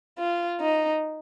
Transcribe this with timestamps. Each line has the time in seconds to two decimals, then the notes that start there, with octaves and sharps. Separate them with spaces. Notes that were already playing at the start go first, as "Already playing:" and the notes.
0.18 F4
0.60 D#4